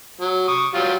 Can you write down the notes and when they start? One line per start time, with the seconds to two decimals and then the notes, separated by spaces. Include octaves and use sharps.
0.21 F#3
0.48 C#6 D#6
0.74 F#3 G3 F4